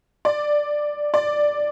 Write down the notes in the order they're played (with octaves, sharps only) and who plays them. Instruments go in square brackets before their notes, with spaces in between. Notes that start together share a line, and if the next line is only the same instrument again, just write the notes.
[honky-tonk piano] D5
D5